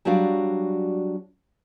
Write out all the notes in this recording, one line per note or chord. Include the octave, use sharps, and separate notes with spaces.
F#3 G3 D4 F#4 D5 F5